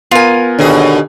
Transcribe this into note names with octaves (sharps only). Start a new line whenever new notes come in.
B3 F4 A#4 G#5
D#2 B2 D3 G#4